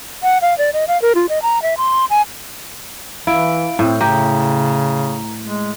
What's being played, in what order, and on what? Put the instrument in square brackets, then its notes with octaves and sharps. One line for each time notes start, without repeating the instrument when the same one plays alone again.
[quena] F#5
F5
D5
D#5
F5
A#4
F4
D#5
A#5
E5
C6
G#5
[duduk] E3 [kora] E4 [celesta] F5 D7
[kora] A2 [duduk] C4
[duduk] C#3 [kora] G4 [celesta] A#5
[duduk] G#3